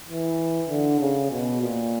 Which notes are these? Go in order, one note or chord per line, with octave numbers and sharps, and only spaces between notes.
E3
D3
C#3
B2
A#2